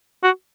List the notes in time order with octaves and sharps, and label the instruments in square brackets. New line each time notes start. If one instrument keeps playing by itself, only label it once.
[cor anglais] F#4